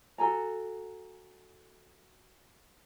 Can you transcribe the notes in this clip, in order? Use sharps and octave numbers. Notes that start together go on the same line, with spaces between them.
F#4 A4 G#5 A#5